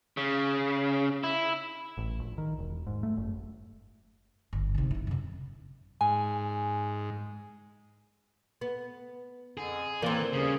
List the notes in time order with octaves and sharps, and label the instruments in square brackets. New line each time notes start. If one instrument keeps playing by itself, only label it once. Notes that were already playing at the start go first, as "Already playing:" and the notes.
[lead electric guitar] C#3
E4
[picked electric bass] A1
A#1
D#3
E1
G#2
A3
F#1
[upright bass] G1
C3 D#3
F#2 E4
F#2 C3
[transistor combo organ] G#2 [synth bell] G#5
[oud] B3
[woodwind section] F2 D3 [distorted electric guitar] G#4
[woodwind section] A2 D#3 D5 [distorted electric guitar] E3 [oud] A#3 C4
[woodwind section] D#2 G3 G#4 [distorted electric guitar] C#3